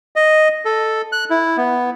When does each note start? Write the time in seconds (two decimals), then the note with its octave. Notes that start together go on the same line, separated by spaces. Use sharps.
0.16 D#5
0.65 A4
1.12 F#6
1.30 E4
1.57 B3